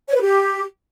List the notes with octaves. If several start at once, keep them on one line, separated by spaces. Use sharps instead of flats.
C#5
B4
G4